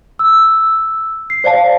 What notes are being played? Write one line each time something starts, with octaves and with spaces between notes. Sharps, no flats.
E6
C7
C5 D5 F5 A5